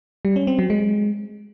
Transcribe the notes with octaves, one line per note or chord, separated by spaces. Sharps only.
G3
C#4
C4
F#3
G#3